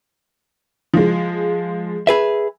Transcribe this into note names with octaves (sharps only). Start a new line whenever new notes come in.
F3 G#3
G#4 B4 E5